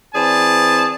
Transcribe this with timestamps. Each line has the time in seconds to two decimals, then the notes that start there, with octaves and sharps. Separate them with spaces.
0.14 E3 C4 G#4 D5 A5